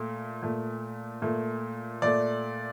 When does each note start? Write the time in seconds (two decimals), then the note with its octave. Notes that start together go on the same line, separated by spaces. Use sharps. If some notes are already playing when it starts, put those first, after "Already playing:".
Already playing: A#2 A3
0.43 A#2 A3
1.22 A#2 A3
2.02 A#2 A3 D5